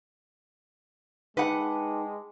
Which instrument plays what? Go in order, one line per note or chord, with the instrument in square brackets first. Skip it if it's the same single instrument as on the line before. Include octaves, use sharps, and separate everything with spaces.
[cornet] G#3 [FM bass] D#4 [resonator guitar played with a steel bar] B4 F#5 [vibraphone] G5 A5 D6